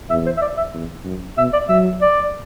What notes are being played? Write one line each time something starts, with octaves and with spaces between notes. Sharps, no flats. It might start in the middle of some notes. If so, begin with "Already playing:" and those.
E2 E5
C5
E5
D5
E5
E2
F#2
B2 E5
D5
F#3 E5
D5